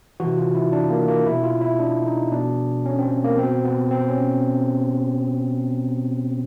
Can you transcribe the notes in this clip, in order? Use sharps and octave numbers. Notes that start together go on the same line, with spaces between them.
C3 E3 F#4
F4
E4
D4
A#3
A#3
B2 E4
F4
E4
D4
D#4
B2 D4
C#4
C4
A#3
B2 C4
B3
C4
C#4